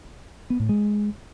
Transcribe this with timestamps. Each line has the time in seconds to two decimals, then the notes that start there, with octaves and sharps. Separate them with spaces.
0.50 B3
0.60 A2
0.69 G#3